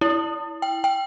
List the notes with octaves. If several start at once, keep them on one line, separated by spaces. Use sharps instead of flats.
E4
G5
G5